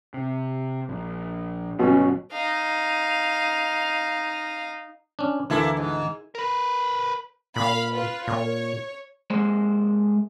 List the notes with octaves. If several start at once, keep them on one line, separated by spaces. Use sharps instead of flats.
C3
A#1
G1 B2 F#3 B3 C#4
D#4 F5
C#4 D4
D2 E3 A#3 E4 A4
G#2
A#4 B4
A#2 F5 B5
F4 B4
A#2 C#5
G#3 A#3 C5